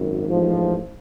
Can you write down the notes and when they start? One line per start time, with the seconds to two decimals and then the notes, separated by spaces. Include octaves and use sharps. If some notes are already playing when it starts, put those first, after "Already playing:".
Already playing: G#1 F#2
0.28 A1 G#2 F3